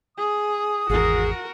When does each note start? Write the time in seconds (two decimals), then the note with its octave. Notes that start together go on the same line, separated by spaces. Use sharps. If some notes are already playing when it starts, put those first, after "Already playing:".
0.17 G#4 D#6
0.89 G#1 E2 F#4 G#4 A#4